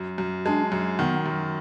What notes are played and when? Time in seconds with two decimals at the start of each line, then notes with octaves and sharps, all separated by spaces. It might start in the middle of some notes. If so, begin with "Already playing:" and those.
Already playing: F#2
0.18 F#2
0.46 G#3 D4
0.72 F#2
0.99 D#3 B3
1.26 F#2